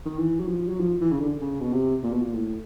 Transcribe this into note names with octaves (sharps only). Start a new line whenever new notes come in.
D#3
E3
F#3
F3
F#3
F3
E3
C#3
D3
C#3
B2
C3
A#2
B2
A#2
A2